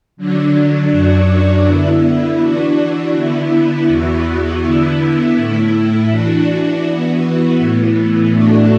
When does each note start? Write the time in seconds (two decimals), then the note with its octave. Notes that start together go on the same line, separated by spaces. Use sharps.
0.17 D3 F#3 D4
0.91 F#2 F#3 D4 F#4
1.65 D3 B3 E4
2.39 E3 D4 F#4
3.13 D3 B3 E4
3.87 E2 E3 B3 F#4
4.61 D3 B3 E4
5.36 A2 A3 E4
6.10 E3 D4 F#4
6.84 E3 B3 F#4
7.58 A2 E3 B3
8.32 A2 A3 D4 F#4